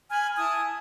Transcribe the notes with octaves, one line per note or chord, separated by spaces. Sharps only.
G#5 B5 F6
E4 G#5 A5 D#6